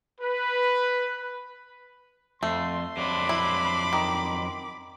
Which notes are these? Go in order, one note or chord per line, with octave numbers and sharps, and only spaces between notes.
B4
F2 A3 C6
F2 F#3 D4 B5 D6
E4
D#3